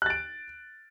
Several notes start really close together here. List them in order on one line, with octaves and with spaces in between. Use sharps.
F#6 A6 D7